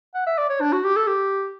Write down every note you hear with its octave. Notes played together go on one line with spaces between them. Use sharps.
F#5
E5
D5
C#5
D4
F#4
G4
A4
G4